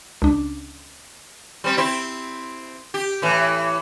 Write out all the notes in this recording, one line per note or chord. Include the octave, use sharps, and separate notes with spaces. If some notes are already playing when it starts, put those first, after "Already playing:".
C#2 D4
G3 C4
C4 E4
G4
A2 E3